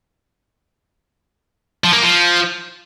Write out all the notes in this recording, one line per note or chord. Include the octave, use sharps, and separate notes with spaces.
F3
A#3
F3